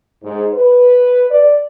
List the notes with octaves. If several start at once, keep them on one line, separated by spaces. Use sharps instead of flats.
G#2
B4
D5